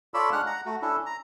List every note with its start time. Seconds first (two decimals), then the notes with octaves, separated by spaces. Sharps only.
0.14 F4 A4 C#5 D5 B5 E6
0.32 G#3 D4 F#5 F6 F#6
0.47 F#5 A#5
0.66 A3 F#4
0.82 C#4 D4 E4 A4
1.06 A#5